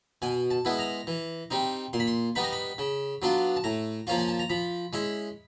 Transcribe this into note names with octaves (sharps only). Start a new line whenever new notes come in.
B2 G#5
A5
G#3 B3 E4
A#5
E3
G3 C4 D#4
A#2 C6
B5
C6
G3 B3 D#4 B5
A#5
B5
C#3
F#3 B3 D4 F4
A5
A2 A#5
F3 A#3 C#4 F4
G#5
A5
A#5
F3 B5
G#3 C#4 E4